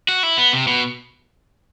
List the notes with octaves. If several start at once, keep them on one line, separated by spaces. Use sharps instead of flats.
F#4
E4
B3
C3
B2